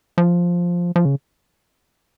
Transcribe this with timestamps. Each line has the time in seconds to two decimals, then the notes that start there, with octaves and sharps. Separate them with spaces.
0.18 F3
0.96 F3
1.05 C#3